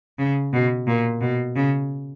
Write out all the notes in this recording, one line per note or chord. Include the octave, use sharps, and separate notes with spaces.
C#3
B2
A#2
B2
C#3